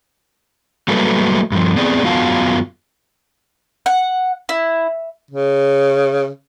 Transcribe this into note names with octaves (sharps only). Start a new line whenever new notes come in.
F#3 G3 A3 A#3 A4 B4
G2 F3
B3 C4 G#4 D5
F#2 B3 F4 F#4 F5 A5
F#5
E4
C#3